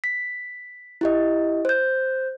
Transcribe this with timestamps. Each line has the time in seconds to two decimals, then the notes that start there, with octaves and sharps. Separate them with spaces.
0.04 B6
1.01 E4 G4 D#5
1.65 C5 G6